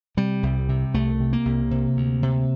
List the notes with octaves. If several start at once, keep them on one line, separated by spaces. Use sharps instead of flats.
C3 G3
C2
C3
C2 A3
C3
A#3
C2
C3
D2
C3